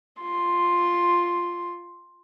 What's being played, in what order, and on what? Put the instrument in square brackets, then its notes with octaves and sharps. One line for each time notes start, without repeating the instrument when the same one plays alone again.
[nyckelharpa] F4 C6